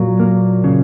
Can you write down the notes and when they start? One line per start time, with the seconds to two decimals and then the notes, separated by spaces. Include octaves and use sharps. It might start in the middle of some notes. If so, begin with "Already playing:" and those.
Already playing: A#2 F#3
0.20 A#3
0.64 C#3